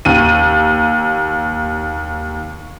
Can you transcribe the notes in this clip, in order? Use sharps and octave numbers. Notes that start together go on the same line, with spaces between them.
D#2 D#7